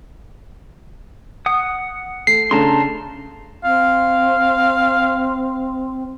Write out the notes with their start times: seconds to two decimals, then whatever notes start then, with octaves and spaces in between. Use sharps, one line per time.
1.46 F#5 D#6
2.27 A3 C7
2.51 C#3 A3 D4 A5 A#5 C6
3.64 C4 F5